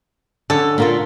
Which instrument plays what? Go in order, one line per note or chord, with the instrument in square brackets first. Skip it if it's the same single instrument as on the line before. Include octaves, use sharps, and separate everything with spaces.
[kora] D3 C#4 [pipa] A4
[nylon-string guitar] A#2 A#3 F4